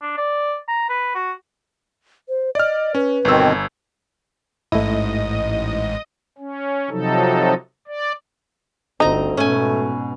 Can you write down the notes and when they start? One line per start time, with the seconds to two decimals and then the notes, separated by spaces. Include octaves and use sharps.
0.01 D4
0.17 D5
0.68 A#5
0.89 B4
1.15 F#4
2.29 C5
2.55 D5 D#5 F6
2.95 C#4 B4
3.25 G1 B2 D#3 C4 E6
4.72 A1 G#2 A3 E4 D#5
6.38 C#4
6.90 C3 F3 F#3 D#4 A4
7.87 D5
9.00 G1 D2 C4 D#4 D#5 A#5
9.37 G#2 B2 A3 C#4 G#5